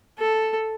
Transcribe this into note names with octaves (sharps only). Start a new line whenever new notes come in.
A4